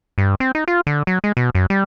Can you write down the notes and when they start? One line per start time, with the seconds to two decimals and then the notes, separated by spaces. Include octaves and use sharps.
0.18 G2
0.40 C4
0.55 D#4
0.68 F4
0.87 D3
1.07 F#3
1.24 G#3
1.37 B2
1.55 F#2
1.70 G3